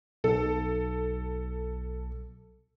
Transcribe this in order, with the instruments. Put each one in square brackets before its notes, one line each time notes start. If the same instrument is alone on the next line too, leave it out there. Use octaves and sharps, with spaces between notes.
[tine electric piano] B1 [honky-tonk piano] A4